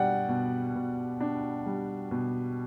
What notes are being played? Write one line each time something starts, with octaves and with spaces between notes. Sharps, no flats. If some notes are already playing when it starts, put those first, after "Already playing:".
Already playing: B2 G3 D4 D5 F#5 G5
B2
B2
D4
G3
B2